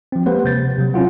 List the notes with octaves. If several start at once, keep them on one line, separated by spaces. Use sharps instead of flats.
F3 C4
G#3 A#3 G4 B4 C5 F#5
C3 G6 A6
C3 F#3
C4 C#4 E4 F4 F#5